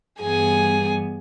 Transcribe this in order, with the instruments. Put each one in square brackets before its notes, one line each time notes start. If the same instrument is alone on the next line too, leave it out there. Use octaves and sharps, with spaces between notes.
[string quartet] G2 E3 G3 B3 G#4 G#5